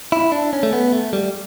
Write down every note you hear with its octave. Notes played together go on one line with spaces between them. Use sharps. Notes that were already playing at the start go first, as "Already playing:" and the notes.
E4
D4
C#4
A3
B3
A3
G3